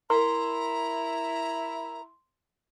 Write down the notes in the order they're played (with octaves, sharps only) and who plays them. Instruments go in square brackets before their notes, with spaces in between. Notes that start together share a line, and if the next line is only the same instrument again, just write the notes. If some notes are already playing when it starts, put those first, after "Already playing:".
[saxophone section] E4 [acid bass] A#4 [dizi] A#5 [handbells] C6